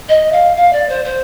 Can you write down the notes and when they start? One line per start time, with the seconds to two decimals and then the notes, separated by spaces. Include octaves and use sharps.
0.09 D#5
0.32 F5
0.56 F5
0.72 D5
0.88 C5
1.05 C5